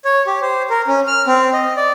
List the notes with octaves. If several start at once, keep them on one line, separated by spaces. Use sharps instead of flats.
C#5
G4
C5
A#4
C#4
F6
C4
D#5
D5